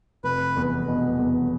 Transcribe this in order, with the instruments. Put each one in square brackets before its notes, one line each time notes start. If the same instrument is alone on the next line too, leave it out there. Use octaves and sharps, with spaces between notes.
[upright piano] F1 [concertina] B4
[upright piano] E2
B2
E2